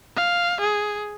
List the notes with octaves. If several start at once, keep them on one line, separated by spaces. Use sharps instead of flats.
F5
G#4